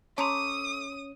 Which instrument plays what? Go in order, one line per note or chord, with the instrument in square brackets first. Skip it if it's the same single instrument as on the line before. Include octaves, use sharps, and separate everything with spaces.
[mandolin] A3 D6 [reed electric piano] C#4 C#5 [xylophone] A5 A#5 C6 [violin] D#6